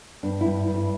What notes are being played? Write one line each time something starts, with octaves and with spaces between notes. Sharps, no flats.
G2 D4
E4
G2
G2
E4